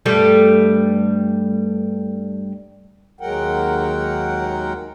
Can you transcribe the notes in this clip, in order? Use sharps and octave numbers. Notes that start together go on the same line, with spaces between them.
G2 G3 A3
D#2 F#3 G#3 A#4 F#5 G5